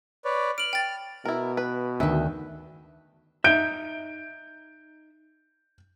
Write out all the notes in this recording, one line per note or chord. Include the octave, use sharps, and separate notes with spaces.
B4 C#5 D5
F6 D7 F#7
G5 A6
B2 E4 A#4
B4
D2 D#3 B4 E5
D#4 E5 G6 D7